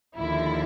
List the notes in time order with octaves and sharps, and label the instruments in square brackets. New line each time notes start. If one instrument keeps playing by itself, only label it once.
[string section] D#2 D3 F3 E4